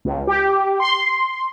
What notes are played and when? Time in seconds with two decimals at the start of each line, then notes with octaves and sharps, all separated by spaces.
0.05 C#2
0.27 G4
0.80 C6